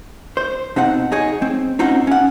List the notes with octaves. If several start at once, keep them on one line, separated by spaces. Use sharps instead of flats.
C5
B2 C4 D#4 F#5
D#4 G#4 C#5
C4
C4 C#4 D#4 F4 F#4 F#5
C#4 F#5